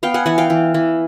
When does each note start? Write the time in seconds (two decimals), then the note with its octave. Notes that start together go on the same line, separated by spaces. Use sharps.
0.03 B3 F5 G5
0.14 F#5 G#5
0.26 E3 F#5 G#5
0.38 F5 G5
0.50 E3
0.74 E3